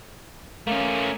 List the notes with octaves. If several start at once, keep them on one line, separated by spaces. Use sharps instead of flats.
A3 A#3 C#4